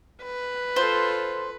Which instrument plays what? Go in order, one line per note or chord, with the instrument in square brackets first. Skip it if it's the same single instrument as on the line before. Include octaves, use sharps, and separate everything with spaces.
[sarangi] B4
[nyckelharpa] F4 A4 [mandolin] C5